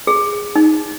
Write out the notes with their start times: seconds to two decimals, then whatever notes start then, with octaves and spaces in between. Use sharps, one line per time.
0.07 G#4
0.56 D#4